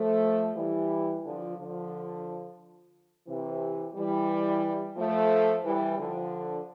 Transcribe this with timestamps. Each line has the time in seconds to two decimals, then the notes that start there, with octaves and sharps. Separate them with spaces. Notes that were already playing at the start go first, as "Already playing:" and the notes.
Already playing: F3 A3
0.55 E3 G3
1.23 D3 F3
1.57 D3 F3
3.27 C3 E3
3.94 E3 G3
4.96 F3 A3
5.63 E3 G3
5.98 D3 F3